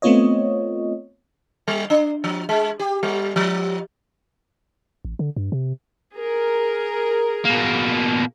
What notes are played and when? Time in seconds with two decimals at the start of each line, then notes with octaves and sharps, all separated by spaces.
0.02 A3 B3 C4 F4 C#5 D#5
1.68 G3
1.90 D4
2.24 F3
2.49 G#3
2.80 G4
3.03 G3
3.36 F3
5.05 A1
5.19 D3
5.36 G2
5.52 C3
6.15 G#4 A#4
7.45 B2 A#3